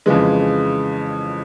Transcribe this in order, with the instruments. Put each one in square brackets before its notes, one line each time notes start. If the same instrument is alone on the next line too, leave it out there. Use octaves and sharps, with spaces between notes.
[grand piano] F2 C#3 E3 G#3